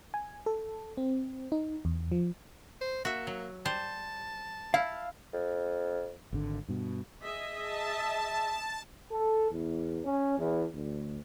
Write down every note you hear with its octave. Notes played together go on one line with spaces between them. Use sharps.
G#5
A4
C4
D#4
E2
F3
C5
A#3 F#4 E5
F#3
G3 C5 A5
E4 F5
F2
G#1 D3
G2 B2
G#4 D#5 E5
A5
A4
E2
C#4
E2
D2